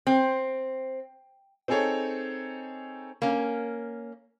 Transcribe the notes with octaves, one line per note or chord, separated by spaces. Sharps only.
C4
C4 D#4 G#4 A4 C#5
A#3 C#4